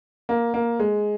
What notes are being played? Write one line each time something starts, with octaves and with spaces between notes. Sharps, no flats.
A#3
A#3
G#3